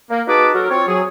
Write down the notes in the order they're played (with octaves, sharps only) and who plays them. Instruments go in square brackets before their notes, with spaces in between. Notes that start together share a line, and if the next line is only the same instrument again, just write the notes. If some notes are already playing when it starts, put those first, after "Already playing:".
[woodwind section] A#3
D#4 F#4 G#4 B4 A5 D6
F#3 F#4 A4 A#4
C4 F4 C#5
F#3 G#4